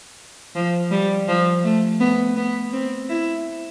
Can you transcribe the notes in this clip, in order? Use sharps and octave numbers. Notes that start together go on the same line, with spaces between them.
F3
G3
F3
A3
B3
B3
C4
E4